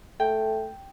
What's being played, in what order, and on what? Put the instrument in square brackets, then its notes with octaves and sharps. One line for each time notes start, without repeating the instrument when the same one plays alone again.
[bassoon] A3 [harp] G5